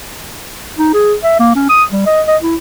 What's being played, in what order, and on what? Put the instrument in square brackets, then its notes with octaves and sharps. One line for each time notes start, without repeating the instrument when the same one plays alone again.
[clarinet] D#4
G#4
E5
A#3
C#4
D#6
G3
D#5
D#5
E4